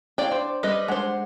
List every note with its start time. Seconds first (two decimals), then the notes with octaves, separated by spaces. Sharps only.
0.18 E4 D5 F5 G5
0.31 D4 C5
0.63 G3 B4 D#5
0.88 G#3 D4 C5 F#5